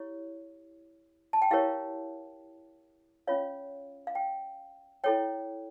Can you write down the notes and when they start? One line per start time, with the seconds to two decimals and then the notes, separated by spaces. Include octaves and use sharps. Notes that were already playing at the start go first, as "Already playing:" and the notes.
Already playing: E4 G4 C#5
1.33 A5
1.42 G5
1.51 E4 G4 A#4 C#5 F5
3.27 C#4 F4 C#5 F5
4.07 F5
4.15 G5
5.04 E4 A4 C#5 G5